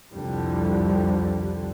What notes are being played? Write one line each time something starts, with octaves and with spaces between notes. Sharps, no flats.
C2 F2 D3 G3